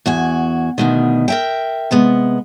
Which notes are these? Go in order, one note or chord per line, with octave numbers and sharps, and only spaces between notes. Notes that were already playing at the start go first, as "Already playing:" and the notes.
E2 F#4 G#5
D2 B2 D#3
A#4 E5 G5
C3 G#3 B3